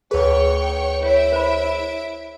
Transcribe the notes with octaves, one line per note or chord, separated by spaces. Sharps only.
D2 G#4 B4 C#5 G5 C#6
E4 C#5 E5 D7
C5 C#5 B5